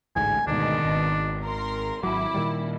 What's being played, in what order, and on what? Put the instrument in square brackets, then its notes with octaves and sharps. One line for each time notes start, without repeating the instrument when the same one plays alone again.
[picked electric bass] A1 D2 G#2 [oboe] G#5
[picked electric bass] D2 G#2 [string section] B2 D#3 [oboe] D4
[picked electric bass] G#1
[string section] A#4 C6
[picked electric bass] G#1 F#3 [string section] E4 [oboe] D6
[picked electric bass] A#2 D#3 G3